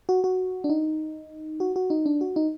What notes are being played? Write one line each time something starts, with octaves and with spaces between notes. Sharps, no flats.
F#4
F#4
D4
D#4
F#4
F#4
D#4
D4
F#4
D#4